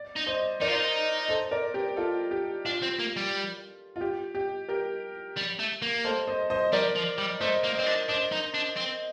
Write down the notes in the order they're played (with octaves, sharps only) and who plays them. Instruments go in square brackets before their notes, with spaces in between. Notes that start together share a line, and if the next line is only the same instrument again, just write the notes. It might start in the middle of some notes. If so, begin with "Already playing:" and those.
Already playing: [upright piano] D5
[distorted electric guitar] D#4
[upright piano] C5 D#5
[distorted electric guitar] D#4 [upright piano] A#4 D5
[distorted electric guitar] F4
D#4
[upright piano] A4 C5
A#4 D5
G4 A#4
F4 A4
G4
[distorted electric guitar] D4 [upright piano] F4
[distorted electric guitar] C4
A#3
G3
[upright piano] F4
G4
G4
G4 A#4
[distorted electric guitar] G3
A3
A#3
[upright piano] A4 C5
C5 D#5
C5 D#5
[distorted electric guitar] G3 [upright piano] A#4 D5
[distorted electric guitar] F3
G3
[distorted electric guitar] A3 [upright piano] C5 D#5
[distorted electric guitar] A#3
[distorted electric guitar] C4 [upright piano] C5 D#5
[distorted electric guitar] D4
[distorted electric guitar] D4 [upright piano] C5 D#5
[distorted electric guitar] D#4
D4
C4